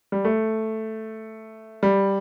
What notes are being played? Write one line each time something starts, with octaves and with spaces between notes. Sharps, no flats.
G3
A3
G3